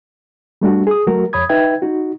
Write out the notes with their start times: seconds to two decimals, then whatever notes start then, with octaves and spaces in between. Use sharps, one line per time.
0.61 G3 A3 D4 F#4
0.87 G#4 D#6
1.07 F#3 A3 F#4 A#4
1.33 F2 C#5 B5 D#6 G#6
1.49 D#4 B4 E5 G5 G#6
1.82 D#4 F#4